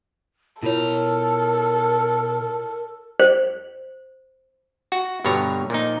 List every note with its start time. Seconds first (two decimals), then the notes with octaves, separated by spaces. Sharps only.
0.63 B2 E4 F4 A4 A#4 C#5 A#5
3.20 C5
4.92 F#4
5.25 G2 B2 D3 C#5 A#5
5.70 A#2 F3 D#4